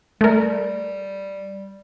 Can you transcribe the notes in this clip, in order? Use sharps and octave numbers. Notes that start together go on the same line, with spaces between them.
G3 A3 A#4